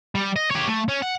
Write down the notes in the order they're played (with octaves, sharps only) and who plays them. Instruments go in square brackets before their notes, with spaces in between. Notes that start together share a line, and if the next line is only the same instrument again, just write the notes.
[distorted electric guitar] G3
D#5
G4 C#5
A3
C#4
F#5